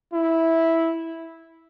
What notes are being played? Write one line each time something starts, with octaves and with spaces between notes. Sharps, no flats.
E4